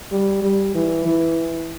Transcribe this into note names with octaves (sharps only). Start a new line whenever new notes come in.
G3
G3
E3
E3